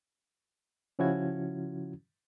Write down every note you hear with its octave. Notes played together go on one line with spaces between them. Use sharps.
C#3 F3 C#4 E4 F#4 G#6